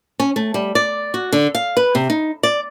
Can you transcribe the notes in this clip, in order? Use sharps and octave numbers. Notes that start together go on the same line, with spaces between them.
C#4
A3
G3
D5
F#4
D3
F5
B4
C3
D#4
D5